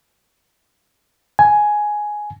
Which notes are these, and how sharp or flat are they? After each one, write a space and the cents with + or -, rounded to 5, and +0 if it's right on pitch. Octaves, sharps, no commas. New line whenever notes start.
G#5 +5